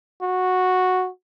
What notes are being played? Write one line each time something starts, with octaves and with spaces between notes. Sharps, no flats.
F#4